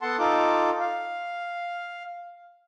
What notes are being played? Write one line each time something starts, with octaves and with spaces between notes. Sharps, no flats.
B3 A4 F#5 A5 C6
D#4 F4 A4 D6
F5